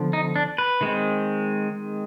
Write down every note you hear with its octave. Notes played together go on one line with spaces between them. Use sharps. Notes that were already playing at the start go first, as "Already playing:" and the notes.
Already playing: D3 F3 B3
D#4
D4
B4
D#3 G#3 C4